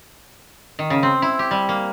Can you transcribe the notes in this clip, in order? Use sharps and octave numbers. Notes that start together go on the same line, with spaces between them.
D#3
C#3
C4
E4
G4
G3
A#3